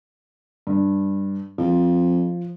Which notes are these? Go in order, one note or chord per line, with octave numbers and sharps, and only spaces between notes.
G2
F2 F3